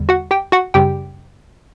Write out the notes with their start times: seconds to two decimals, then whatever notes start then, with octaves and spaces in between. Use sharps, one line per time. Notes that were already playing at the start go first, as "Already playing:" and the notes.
Already playing: E2 D3 G3
0.09 F#4 F#5
0.31 G4 G5
0.52 F#4 F#5
0.74 F#2 C#3 G3 G4 G5